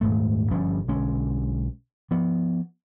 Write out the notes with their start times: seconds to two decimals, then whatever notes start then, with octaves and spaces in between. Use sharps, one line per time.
0.01 D#1 G#2 A3
0.51 G1 F3 G3 C#4
0.88 B1 D3 G#3 C#4
2.11 F3 B3